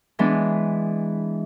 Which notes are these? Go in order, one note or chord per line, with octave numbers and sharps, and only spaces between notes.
E3 G#3 B3 D4